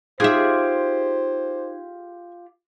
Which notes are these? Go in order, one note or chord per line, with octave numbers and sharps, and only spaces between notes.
D#4 F4 G4 G#4 C5 E5 G#6